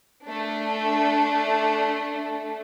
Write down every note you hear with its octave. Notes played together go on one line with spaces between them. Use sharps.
A3 D4